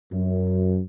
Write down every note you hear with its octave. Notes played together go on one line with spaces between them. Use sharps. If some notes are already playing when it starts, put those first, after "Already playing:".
F#2